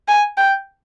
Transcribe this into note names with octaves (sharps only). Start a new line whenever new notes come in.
G#5
G5